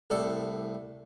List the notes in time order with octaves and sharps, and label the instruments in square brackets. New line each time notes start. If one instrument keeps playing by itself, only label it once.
[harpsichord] C2 A2 A4 D5